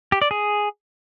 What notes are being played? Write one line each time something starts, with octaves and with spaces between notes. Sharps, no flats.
G4
D5
G#4